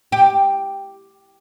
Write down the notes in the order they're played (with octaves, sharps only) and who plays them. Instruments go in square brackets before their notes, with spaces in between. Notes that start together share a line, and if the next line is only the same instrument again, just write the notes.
[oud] G4